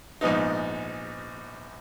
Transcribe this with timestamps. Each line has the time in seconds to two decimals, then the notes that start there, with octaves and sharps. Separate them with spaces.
0.21 A#1 G#2 B3 D#4